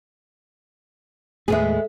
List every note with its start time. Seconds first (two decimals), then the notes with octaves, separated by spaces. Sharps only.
1.48 D#2 A2 G#3 A3 B3 G#4 A4 E5